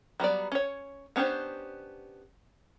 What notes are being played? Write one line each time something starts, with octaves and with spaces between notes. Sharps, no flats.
F#3 G3 B3 D5
C#4 C#5
B3 C#4 D4 G4 C5